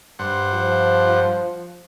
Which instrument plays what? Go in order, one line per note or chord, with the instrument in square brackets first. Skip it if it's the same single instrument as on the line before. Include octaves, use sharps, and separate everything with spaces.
[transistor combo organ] G2 C5 F#5
[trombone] F3